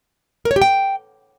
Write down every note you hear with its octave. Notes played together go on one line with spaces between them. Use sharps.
A#4
C#5
G4
G5